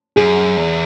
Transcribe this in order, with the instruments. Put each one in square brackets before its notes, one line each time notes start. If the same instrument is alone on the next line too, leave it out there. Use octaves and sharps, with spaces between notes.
[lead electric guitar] F#2 [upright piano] G#4
[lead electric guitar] E2